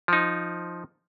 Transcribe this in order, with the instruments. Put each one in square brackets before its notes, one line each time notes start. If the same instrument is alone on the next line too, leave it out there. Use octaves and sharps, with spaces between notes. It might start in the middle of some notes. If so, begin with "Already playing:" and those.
[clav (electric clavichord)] F3 D#4